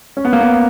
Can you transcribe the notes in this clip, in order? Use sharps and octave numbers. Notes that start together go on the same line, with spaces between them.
C#4
B3
A#3
B3